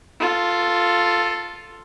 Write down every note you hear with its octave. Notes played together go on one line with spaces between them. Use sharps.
F4 A4